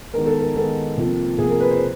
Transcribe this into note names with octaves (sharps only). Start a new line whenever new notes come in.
D#3 G#3 B3 A#4
A4
A#4
D#3 G#3 B3 A4
C3 F3 A#3
C3 F3 A#3 G#4
A#4
B4
C5